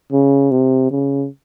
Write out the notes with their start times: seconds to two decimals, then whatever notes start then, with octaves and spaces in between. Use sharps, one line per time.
0.12 C#3
0.51 C3
0.91 C#3